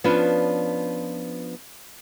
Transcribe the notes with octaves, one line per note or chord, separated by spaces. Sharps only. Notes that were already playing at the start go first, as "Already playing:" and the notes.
F3 B3 C#4 D4 F4 B4